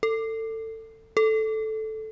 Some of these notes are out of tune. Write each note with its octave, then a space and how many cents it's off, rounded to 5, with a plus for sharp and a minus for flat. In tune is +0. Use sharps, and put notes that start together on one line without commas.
A4 +25
A4 -5